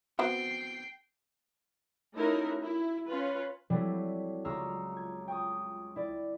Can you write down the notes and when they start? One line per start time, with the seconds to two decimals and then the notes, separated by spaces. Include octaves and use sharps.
0.19 B3 C4 F#4 G5 C7
2.15 A3 C#4 D#4 E4 F#4 A#4
2.63 E4
3.07 C#4 F4 B4
3.70 F#3 G3 A3 C4 E4
4.45 C#2 F4 A#5 C#6 E6 F6
4.97 G#6
5.28 G5 C#6 D#6
5.96 E4 D5